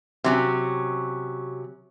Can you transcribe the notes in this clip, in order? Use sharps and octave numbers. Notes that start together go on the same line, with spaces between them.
C3 F#3 C#4